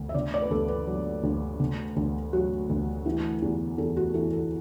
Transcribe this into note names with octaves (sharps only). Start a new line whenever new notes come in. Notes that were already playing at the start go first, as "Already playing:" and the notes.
Already playing: D2
E5
D3 D5
D5
B4
D2 A4
B4
F#3
D2
D3
D2
F#3 F#4
D2
E3
E2
E2 A4
F#4
E3 A4
A4